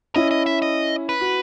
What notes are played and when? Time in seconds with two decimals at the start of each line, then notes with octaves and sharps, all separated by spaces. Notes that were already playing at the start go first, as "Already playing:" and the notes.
0.16 C#4 E4 D#5
0.31 D#5
0.46 E5
0.62 D#5
1.09 B4
1.21 F#4